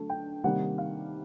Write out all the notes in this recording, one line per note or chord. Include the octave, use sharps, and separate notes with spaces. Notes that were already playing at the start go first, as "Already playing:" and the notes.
Already playing: D3 F#3 A3
G5
C3 D#3 G3 A#3 F#5
F5